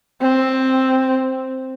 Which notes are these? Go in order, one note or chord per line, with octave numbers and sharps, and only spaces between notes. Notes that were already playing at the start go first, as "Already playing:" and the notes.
C4